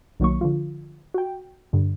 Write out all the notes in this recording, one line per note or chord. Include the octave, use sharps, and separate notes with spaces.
B1 D#3 F#3 A#3 C#6
D3 F3 F4
F#4 G5
G2 D3